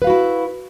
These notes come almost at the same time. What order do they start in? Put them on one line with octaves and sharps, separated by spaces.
B4 F5 F#4 E4